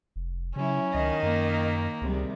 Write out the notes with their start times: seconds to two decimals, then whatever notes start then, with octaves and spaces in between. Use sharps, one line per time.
0.16 F1
0.56 C#3 F#3 C#4 E4
0.94 C#2 D#3 D#5
1.23 F#2 A#3
2.01 C#2 C3 G3 G#3